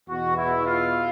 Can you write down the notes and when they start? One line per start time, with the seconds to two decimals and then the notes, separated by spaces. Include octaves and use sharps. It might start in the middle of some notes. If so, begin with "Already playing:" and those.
0.08 E2 B2 F#4
0.37 E4
0.65 F4